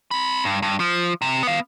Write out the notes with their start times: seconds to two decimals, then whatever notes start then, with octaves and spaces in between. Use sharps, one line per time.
0.11 C4 B5
0.45 G2
0.62 G2
0.80 F3
1.22 C3
1.43 B3 F5